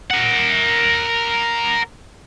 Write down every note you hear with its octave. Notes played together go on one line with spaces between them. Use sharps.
A#4 F#5